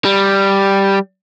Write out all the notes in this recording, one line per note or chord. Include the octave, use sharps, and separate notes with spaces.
G3